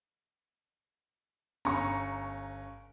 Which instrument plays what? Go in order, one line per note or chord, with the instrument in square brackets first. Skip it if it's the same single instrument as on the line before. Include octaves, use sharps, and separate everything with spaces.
[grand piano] G1 C#4 [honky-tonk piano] A#5 C#6